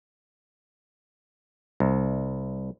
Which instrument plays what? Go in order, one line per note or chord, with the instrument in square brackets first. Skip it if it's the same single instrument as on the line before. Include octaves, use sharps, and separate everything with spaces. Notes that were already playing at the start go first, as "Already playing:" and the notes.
[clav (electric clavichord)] C2